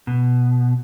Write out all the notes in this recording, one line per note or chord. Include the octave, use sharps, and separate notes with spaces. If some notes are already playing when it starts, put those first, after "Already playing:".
B2